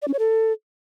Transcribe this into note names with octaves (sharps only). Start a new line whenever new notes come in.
D5
C#4
C#5
A4